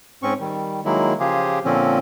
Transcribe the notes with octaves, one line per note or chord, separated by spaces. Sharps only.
G#2 C4 C#4 C#6
D#3 G3
D#3 F#3 G#3 A#3 E4
C#3 F3 F4 G4 G#4
A#2 D3 F3 C4 C#4